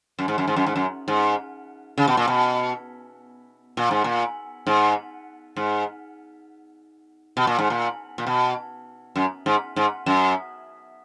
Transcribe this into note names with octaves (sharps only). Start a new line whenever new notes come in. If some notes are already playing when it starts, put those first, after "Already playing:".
F#2
G#2
F#2
G#2
F#2
G#2
F#2
G#2
C#3
B2
A#2
B2
A#2
G#2
A#2
G#2
G#2
B2
A#2
G#2
A#2
A#2
B2
F#2
G#2
G#2
F#2